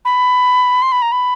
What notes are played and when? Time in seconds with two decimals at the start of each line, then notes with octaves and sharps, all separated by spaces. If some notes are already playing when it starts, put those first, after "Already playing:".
0.05 B5
0.82 C6
0.92 B5
1.02 A#5
1.12 B5